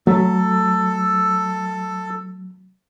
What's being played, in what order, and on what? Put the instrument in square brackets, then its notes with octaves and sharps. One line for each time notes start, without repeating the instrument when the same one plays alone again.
[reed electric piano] F#3 [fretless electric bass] A3 [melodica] A4